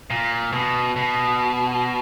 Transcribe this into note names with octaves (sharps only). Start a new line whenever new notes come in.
A#2
B2
B2